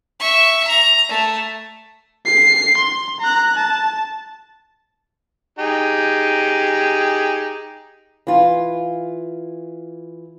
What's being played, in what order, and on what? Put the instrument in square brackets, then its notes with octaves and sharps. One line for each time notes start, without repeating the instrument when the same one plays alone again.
[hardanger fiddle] E5 C#6
A#5
A3
[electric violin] C7
C6
A#5 F#6
A5
[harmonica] D#4 G4 G#4
[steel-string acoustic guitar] E3 F4